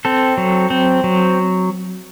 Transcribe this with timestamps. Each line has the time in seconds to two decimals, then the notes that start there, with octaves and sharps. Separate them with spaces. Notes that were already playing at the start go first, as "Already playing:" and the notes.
0.05 C4 A4
0.38 F#3
0.70 C4
1.04 F#3